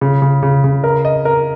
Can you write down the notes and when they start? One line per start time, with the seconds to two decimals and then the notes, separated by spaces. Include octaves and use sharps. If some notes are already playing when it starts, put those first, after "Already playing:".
0.01 C#3
0.22 C#3
0.43 C#3
0.64 C#3
0.84 A#4
1.05 D#5
1.25 A#4